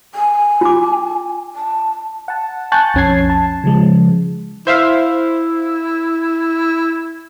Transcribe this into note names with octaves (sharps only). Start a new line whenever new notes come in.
G#5
F4 D6
A5
F#5 A5
G#5 A5 C#6 F#6 G6 A6
B1 F2 C#4 A5 G#6 C7
A5
C#3 F3 G#3
E4 C5 E5 F5